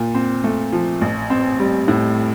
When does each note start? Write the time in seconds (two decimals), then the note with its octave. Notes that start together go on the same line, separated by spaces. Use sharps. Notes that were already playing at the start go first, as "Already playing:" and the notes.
Already playing: A#2
0.15 C4
0.44 A3
0.72 F3
1.01 A1
1.30 C4
1.59 G3
1.88 A2